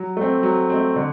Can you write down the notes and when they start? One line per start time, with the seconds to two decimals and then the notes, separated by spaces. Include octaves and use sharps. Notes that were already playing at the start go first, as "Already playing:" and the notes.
Already playing: F#3
0.17 A3 C4
0.43 F#3
0.70 A3 C4
0.96 D3